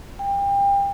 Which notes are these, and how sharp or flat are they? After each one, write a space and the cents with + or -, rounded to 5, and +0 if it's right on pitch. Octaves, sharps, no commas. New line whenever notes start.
G5 +30